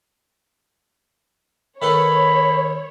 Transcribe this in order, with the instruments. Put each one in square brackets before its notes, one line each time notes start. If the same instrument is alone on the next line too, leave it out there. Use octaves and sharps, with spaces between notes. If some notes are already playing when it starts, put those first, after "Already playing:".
[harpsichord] D#3 A4 B4 [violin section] C#5 [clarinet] B5